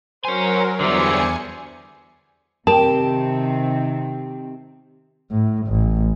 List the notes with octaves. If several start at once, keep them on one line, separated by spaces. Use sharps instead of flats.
F#3 A#4 C5 C#5 G#5
E2 D3 G3 C5 D5 E5 G#5 C#7
C3 D#3 C4 G4 A#4 A5
A2
A1